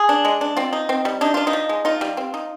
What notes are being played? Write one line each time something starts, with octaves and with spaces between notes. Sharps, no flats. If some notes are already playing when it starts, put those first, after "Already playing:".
Already playing: G#4
D4
G#3
D4
C4 F4
D#4
C4
G3
D4 D#4
D4 F4
D#4
F3
G#3
D#4 F4
G3
C4
D#4